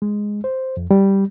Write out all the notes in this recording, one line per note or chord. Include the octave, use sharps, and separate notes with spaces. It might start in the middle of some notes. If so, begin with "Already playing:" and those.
G#3
C5
F2
G3